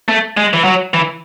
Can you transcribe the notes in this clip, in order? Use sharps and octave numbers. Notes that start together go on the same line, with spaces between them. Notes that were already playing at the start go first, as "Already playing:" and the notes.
A3
G#3
E3
F#3
E3